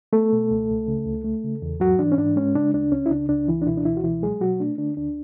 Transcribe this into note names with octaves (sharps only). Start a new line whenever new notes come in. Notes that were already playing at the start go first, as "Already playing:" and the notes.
A3 B3 A4
B2
C#2
C#2
C#3
C#2
A3
C#3
E2
G#2 F#3 F#4
E3 D4
C#4
G#2 D4
G#3 C#4
C#3 D4
D2 D4
C#2 C#4
E4
C#3 D4
C#2 D4
C#2 E3 E4
D4
B2 E3 E4
D4
C#2 E3 E4
F#4
B2 E3 E4
F#3 G#3 G#4
B2 F#3 F#4
A3 D4
D3 D4
D2 D4